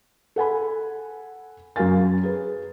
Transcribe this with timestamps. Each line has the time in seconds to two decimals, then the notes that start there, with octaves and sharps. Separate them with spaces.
0.36 A4 F#5 G#5 B5
1.76 F#2 F#3 A#4 F5 G#5 A6
2.23 G#4 B4